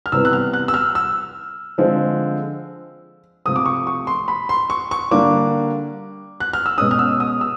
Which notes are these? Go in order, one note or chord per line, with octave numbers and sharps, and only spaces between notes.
F6
C3 E3 G3 B3 E6
F#6
F6
F#6
E6
F6
E6
D3 F3 G#3 C4
C3 F3 A3 C4 D#6
D6
C#6
C#6
C6
B5
C6
C#6
C#6
D3 G3 A#3 D4 D6
F#6
F6
E6
B2 G#3 C#4 D#6
F6
E6
D#6
E6